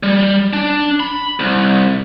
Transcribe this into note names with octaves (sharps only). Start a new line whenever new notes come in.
G3
D4
B5
C2